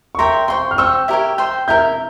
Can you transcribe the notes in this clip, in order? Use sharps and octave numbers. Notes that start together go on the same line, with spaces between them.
C#6
A#4 C#5 E5 G5 C6
C5 G5 C6 C#6
F6
C5 G5 C#6 E6
E4 G4 A#4 C#5
C5 G5 C6
E4 A#4 E5 G6